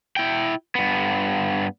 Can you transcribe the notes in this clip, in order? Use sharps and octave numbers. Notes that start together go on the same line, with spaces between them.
E4 G5
G2 B3